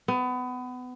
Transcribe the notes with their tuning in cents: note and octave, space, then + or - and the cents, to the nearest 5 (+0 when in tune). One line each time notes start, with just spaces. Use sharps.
B3 +25